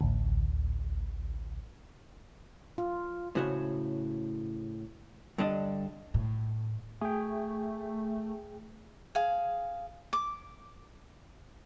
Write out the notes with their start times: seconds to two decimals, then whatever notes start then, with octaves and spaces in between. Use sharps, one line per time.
0.01 A1 D2
2.78 F4
3.35 A2 C#3 F#4 C5 C#5
5.38 G2 D3 D4 D#5
6.14 A2
7.01 A3 G#4 G5
9.15 G#4 F5
10.13 D6